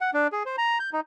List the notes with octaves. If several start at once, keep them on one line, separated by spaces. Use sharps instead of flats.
F#5
D4
G#4
C5
A#5
G6
D#4